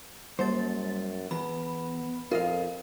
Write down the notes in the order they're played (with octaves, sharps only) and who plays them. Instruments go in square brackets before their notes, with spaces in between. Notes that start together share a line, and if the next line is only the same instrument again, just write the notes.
[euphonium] F#2 [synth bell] G3 A#3 A6 [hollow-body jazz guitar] C5
[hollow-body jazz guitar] E2 [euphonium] B3 [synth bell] B5
[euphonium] F2 [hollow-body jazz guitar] F4 D#5 F5 [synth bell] A#4